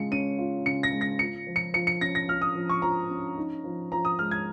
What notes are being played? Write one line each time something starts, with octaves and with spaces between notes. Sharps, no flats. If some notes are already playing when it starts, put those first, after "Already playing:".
Already playing: C#3 G#3 F4 C#7
C#4 D#7
F4
C#3 C#7
A#6
G#3
A#6
F4 C#7
F3
C#7
F3 C#7
C#7
C#4 A#6
A#6
F4 F6
D#6
F3
C#6
F3 A#5
C#4
D#4
F3
F3 A#5
D#6
G#3 F6
G#6